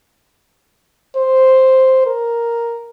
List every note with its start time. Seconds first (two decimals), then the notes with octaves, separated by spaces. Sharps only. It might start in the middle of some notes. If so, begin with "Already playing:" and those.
1.16 C5
2.06 A#4